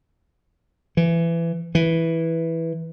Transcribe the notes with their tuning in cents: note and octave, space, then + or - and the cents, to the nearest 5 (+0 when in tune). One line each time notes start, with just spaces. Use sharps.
E3 +25
E3 -5